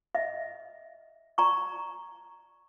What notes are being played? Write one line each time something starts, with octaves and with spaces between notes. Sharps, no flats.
D#5 E5
D5 A#5 C#6